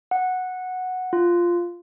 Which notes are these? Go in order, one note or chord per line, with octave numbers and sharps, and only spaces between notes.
F#5
F4